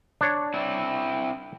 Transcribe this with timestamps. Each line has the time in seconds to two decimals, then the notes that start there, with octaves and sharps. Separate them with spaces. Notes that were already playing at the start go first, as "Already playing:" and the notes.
0.21 D4 C#5
0.54 C4 E4